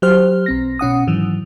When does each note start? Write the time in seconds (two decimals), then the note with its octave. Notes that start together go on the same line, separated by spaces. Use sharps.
0.02 F#3 G4 C5 F6
0.46 B1 C4 A#6
0.79 B2 C#4 F#5 D#6
1.07 G#2 D#3 E3 F#3